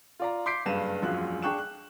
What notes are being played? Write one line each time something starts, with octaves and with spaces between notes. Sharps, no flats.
F4 D5 A#5
C6 D6 G6 B6 C7 D7
F#1 G2 B4 F5 D#7 E7
E1 A#1 F#2 F4 F#6
D4 G#4 G5 C#6 F#6 E7
F#6